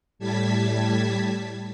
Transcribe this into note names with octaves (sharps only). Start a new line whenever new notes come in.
A2 G3 A5 G#6 B6